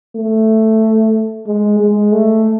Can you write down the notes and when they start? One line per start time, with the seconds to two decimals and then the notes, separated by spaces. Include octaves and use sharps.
0.16 A3
1.47 G#3
1.80 G#3
2.12 A3